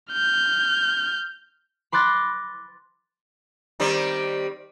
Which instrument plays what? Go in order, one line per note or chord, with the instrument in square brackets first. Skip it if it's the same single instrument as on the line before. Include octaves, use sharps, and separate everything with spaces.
[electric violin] F6 G6
[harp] B5 C6 D6 F#6 A6 A#6
[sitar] D#3 G3 C4